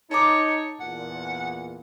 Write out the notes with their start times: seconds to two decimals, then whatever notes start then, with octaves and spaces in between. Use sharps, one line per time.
0.11 D#4 A4 C#5 A#5 D6
0.80 E2 A#2 F#5